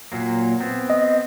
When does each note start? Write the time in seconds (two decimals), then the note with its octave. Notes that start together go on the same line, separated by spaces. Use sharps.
0.12 A#2 F#3 A#3
0.60 B3 C4
0.90 D#5